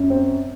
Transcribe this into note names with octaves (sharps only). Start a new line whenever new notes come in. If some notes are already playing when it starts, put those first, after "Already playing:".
Already playing: F#2
C4